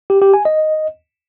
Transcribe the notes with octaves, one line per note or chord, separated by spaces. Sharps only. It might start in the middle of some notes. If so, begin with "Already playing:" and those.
G4
G4
G#5
D#5